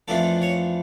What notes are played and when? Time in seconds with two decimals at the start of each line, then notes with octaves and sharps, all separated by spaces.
0.08 F2 E3 A3 D4 F4 A4
0.42 C#5